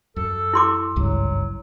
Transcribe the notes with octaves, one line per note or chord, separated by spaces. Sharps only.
F#2 A4
E4 C6 D6
G#1 C#2 G2 F#3